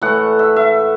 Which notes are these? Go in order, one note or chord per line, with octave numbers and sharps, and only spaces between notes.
A2 E3 A3 F#5
E5
E5